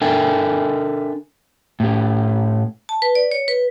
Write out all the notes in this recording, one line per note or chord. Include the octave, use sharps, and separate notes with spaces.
D4 A4 A#4 E5 G5 G#5
A2 G4
A5
B4
D5
C#5
B4